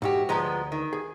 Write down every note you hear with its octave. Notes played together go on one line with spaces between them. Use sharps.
E2 G#2 F#4 G4
D2 F3 G#3 B3 A#5
D#3
G#4